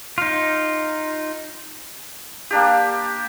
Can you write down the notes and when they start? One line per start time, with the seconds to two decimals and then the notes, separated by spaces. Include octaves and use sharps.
0.18 D#4 F4
2.51 A#3 D4 G4